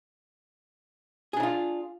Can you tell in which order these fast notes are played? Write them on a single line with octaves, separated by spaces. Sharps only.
G#4 D4 D#4 F4